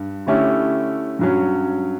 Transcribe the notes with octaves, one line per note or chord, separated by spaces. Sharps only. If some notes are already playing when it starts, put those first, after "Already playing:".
Already playing: G2
D3 A3 C#4 E4 G4
G2 F#3 C#4